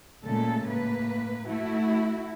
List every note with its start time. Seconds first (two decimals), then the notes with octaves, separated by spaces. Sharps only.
0.24 A#2 C#3 G#3 A3 A4
0.67 A2 A#3 B4
1.48 A3 E4 F#4